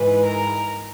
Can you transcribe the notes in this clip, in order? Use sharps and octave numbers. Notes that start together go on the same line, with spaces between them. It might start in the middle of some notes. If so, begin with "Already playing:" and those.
Already playing: G#2 E3 G#3 B4
A#4